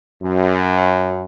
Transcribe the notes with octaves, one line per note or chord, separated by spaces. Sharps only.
F#2